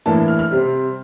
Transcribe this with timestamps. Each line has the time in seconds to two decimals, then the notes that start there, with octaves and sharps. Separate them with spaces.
0.06 A2 E3 A#3 D4 A5
0.28 F6
0.39 F6
0.51 C3 G3 C4